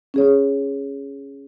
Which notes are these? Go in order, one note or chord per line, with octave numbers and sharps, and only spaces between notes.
C#4 G#4 C#5